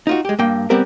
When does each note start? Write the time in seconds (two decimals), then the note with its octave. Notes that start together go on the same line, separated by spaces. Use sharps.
0.07 D#4 F4 F#4
0.25 G#3 G4
0.39 G2 A#3 G5
0.70 G3 B3 C4 G4 A#4 B4